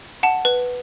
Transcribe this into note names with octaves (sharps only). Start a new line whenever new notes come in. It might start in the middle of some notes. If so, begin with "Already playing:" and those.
F#5 A5
B4